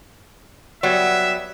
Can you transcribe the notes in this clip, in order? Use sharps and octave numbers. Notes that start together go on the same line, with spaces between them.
F#3 G3 B3 E5